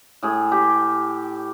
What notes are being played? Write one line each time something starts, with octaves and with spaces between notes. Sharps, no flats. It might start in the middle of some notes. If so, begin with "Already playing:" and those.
A2 G#4
G4